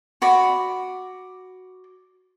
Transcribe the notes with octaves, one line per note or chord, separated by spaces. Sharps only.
F#4 D5 B5